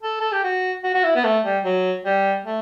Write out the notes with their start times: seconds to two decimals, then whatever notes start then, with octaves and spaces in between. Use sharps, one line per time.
0.03 A4
0.21 A4
0.32 G4
0.44 F#4
0.84 F#4
0.94 F#4
1.04 E4
1.16 B3
1.24 A3
1.44 G3
1.64 F#3
2.05 G3
2.45 A3